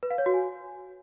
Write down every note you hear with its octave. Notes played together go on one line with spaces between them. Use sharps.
B4
F5
C#5
F#4
G#5